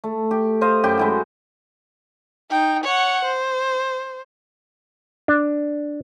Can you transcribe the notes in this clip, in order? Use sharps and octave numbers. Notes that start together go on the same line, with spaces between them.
A3
G4
C5 D#5 F5
F#2 G4 G5
G#3 E4 F#4
D#4 G5
C#5 F#5
C5
D4